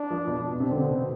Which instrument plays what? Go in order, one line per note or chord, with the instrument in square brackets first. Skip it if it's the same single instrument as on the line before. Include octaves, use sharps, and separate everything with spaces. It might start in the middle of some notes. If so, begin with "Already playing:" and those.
Already playing: [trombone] D4
[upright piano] F3
B2
B2
[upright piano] C3 [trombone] C4
[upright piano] D3
B2